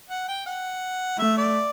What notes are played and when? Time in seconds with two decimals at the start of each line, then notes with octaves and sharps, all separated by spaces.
0.10 F#5
0.28 G5
0.46 F#5
1.19 A3 E5
1.38 D5